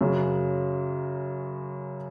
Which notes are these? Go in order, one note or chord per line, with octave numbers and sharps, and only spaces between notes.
F#2 C#3 F#3